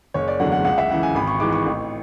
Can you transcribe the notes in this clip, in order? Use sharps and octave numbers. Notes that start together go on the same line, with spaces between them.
F#1 C#5
D5
E2 D3 F#3 A3 F#5
F#5
C#2 F#5
E5
C#3 E3 F#5
G#5
G#1 B5
C#6
G#2 E3 D6
C#6
A1